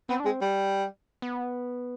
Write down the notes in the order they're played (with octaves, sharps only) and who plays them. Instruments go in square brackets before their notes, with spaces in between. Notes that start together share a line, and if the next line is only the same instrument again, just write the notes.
[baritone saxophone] B3 [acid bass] C4
[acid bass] D4
[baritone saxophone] G#3 [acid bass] C4
[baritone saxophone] G3
[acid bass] B3